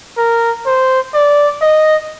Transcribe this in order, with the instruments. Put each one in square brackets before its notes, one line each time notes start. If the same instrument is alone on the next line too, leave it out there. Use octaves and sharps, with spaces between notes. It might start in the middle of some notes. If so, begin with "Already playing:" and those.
[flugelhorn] A#4
C5
D5
D#5